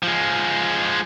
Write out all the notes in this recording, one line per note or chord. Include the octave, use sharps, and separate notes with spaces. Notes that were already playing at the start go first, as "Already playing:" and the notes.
F3 G#3